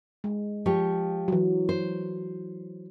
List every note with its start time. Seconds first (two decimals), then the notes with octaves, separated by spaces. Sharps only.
0.24 G#3
0.66 F3 G4 C#5
1.28 E3 F#3
1.69 C5